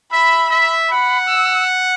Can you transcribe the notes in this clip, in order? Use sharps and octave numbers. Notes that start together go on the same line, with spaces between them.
E5 B5
E5
F#5 B5
E6